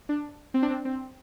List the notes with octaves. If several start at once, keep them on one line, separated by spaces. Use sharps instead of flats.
D4
C4
D4
C4
C4